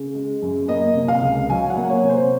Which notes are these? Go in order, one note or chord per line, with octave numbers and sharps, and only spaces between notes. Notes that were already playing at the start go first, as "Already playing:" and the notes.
Already playing: C#3
G#3
F#2
A#3 D#5
C3
F5
C#2
F#3 G#5
F#5
A#3
C#5
C3
C5